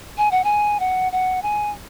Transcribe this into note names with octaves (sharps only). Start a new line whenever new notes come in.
G#5
F#5
G#5
F#5
F#5
G#5